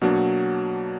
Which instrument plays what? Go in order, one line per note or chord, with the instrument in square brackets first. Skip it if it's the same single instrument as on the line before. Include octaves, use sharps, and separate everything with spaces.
[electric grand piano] B2 A#3 D4 [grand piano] F#3